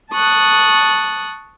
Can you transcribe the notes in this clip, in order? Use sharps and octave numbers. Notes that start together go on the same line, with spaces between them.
A5 C#6 D#6 F#6